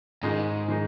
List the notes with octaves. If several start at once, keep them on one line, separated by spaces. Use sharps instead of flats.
G#2 D#3 G#3 D#4
D#3 G#3 D#4